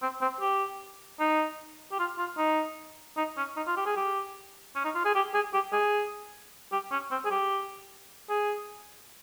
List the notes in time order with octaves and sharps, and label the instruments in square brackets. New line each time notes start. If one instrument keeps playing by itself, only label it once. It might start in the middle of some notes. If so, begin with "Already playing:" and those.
[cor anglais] C4
C4
G4
D#4
G4
F4
F4
D#4
D#4
C#4
D#4
F4
G4
G#4
G4
C#4
D#4
F4
G#4
G4
G#4
G4
G#4
G4
C#4
C4
G#4
G4
G#4